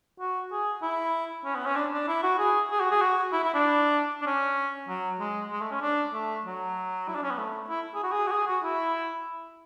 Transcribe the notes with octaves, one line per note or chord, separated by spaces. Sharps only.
F#4
G#4
E4
C#4
B3
C#4
D4
D4
E4
F#4
G#4
G#4
F#4
G#4
F#4
E4
E4
D4
D4
C#4
F#3
G#3
G#3
A3
C#4
D4
A3
F#3
E4
D4
C#4
B3
A3
E4
G#4
F#4
G#4
F#4
G#4
F#4
E4